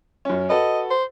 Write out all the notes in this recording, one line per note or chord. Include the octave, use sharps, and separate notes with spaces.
F#2 C#4
F#4 A4 B4 D#5
C5